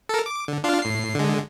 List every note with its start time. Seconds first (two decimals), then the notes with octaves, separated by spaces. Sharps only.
0.09 A4 A#4
0.26 D6
0.48 D3
0.64 D4 F4 F5
0.82 A2 C7
1.15 D3 G#3